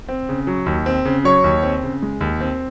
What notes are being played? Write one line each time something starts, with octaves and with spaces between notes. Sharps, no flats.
C4
C#3
F#3
D#2
C4
C#3
F#3 C#5 C#6
D#2
C4
C#3
G#3
D#2
C4